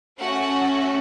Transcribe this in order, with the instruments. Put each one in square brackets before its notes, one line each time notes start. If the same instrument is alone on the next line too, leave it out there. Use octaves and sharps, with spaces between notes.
[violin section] A3 C#4 F#4 F#5